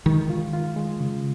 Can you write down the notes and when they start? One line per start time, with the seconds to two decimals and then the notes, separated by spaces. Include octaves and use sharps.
0.06 D#3 G#3
0.30 F4
0.53 F4
0.76 G#3
1.00 C#3